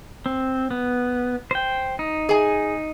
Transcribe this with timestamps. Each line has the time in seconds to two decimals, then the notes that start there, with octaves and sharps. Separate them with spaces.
0.26 C4
0.71 B3
1.51 C5 G5
1.99 D#4
2.29 G#4 G#5